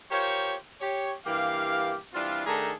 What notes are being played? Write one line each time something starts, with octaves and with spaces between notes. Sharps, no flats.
F4 G4 A#4 C5 C#5
G4 C#5
G2 E3 A#3 G4 F5
E3 G3 C4 D4 F4
D#3 A3 D4 G#4 A4 A#5